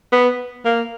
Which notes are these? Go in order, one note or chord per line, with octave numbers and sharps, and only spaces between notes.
B3
A#3